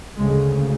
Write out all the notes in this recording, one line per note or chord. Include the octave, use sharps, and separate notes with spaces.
D2 C#3 G#3